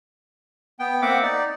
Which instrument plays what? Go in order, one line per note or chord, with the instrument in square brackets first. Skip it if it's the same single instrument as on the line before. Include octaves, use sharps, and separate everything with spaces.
[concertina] B3 G5
A#3 C4 E5 F#5 D6
D#4 D5